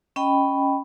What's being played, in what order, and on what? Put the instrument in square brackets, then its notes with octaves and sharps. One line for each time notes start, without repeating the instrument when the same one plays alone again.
[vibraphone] C#4 D#5 G5 B5